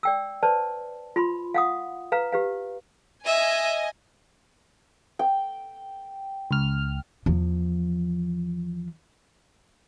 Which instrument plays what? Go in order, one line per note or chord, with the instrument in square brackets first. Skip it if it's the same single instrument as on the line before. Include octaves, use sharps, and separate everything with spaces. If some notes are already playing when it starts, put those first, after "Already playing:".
[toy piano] D5 G5 E6
B4 C5 D5 A5
F4 B5 C6
F5 F#5 D#6
B4 F5 A#5
G4 B4 F5
[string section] D#5 G#5 [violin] E5
[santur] G5
[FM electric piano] C#2 F6
[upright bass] E2 F3